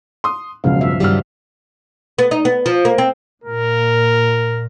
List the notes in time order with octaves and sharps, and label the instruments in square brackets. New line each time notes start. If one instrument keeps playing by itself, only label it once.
[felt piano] C6 D#6
[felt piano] E1 C#2 F#3 [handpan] C#3 F3 F5
[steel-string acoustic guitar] G2 [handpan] E5
[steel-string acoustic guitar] G2 D#3 G3 [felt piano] F#3 F6
[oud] B3
D#4
B3
F3
A#3
C4
[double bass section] A#2 [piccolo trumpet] A#4